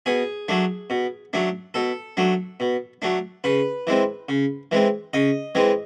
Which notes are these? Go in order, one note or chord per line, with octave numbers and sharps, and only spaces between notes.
B2 G#4
F#3 A3 D4
B2
F#3 A3 D4
B2 A4
F#3 A3 D4
B2
F#3 A3 D4
C#3 B4
E3 G#3 C4
C#3
E3 G#3 C4
C#3 D#5
E3 G#3 C4